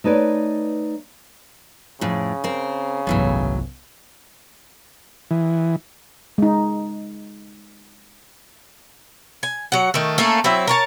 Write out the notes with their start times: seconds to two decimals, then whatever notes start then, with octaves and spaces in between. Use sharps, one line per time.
0.04 A3 D#4 B4 C#5 D5
2.01 F2 A2 C#3
2.44 C4 A#4
3.07 G1 C2 A2 E3 F#3
5.31 E3
6.38 G#3 D#4
9.43 G#5
9.72 F#3 F#5
9.94 D#3 A3
10.18 A3 A#3 C#4 A4
10.44 F#3 C4 E4 E5
10.67 A#4 C#5 A5